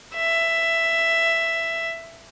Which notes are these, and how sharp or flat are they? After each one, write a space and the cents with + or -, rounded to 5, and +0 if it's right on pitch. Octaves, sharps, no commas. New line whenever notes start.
E5 +10